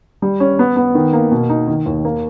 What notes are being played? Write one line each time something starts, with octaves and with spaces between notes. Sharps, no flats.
G3
C#4
B3
B3
D#3
A#3
B2
D#4
D#3
D#2
A#3